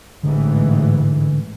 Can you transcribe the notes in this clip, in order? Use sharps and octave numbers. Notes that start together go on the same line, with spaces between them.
A1 G#2 D3 E3